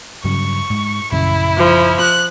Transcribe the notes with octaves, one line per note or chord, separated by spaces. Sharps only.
G2 C#3 F#3 C#6
G#2
A#1 F#2 C#3 E4
F3
F#6